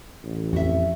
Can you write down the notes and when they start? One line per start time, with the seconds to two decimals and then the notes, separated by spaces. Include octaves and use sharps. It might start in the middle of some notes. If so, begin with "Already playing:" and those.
0.23 A1
0.53 F2 F#4 E5